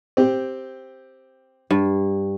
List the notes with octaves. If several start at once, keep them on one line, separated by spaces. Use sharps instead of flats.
C4 G4
G2